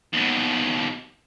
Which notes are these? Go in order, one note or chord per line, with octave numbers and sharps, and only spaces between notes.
D#2 B2